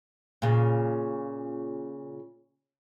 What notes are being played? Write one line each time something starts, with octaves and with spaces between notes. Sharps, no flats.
A#2 C#3